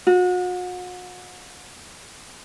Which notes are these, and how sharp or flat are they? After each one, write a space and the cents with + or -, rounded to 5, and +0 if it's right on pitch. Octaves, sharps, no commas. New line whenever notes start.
F#4 -40